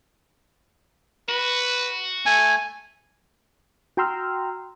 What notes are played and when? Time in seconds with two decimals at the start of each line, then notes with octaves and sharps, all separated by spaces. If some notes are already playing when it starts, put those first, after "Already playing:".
1.29 F#4 B4
2.26 A3 G#5
3.97 F#4 G5 A#5 C6 E6 F6